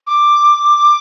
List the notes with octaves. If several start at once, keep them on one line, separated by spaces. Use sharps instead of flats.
D6